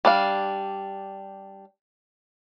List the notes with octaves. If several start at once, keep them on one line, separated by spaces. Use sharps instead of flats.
G3 D4 F5